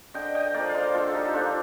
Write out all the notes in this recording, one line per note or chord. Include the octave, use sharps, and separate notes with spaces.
D3 D#5 G5
D#5 G5
F3 A#3 D5 F5
F5
C5 D#5
D3 F4 A4
A4
D#4 G4
F3 A#3 D4 F4